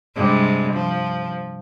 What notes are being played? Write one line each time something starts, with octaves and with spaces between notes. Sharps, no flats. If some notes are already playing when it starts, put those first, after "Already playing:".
G2 C3 G#3
F3